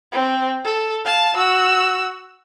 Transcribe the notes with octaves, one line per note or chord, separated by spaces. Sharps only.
C4
A4
F5 A5
F#4 E6